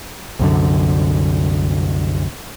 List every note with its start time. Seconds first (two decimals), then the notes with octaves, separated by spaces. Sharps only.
0.39 C2 F#2 D3